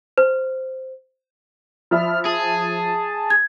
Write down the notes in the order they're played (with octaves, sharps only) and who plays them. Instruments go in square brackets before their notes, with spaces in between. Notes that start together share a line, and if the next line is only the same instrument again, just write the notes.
[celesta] C5
[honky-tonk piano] F3 E5 B5 [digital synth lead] F6
[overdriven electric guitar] G#4 [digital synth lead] A5
[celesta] G#6